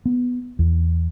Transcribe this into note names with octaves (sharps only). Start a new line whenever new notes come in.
B3
E2